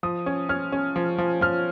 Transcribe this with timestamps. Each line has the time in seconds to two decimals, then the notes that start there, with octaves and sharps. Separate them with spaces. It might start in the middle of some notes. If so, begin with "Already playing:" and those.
0.03 F3 D#6
0.26 C#4
0.49 C#4 F6
0.72 C#4
0.96 F3
1.18 F3
1.41 F3 F6